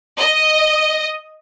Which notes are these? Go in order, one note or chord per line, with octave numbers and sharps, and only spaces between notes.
D#5